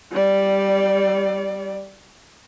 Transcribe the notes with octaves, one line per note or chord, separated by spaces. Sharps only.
G3 D5